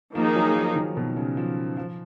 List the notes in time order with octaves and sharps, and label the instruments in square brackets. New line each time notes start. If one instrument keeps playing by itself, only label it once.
[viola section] D#3 A#3 D#4 G#4 [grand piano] F3
[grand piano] F#3
F3
D#3
B2
C#3
F3
F3